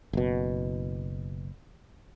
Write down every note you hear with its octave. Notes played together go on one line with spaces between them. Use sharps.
F#1 B2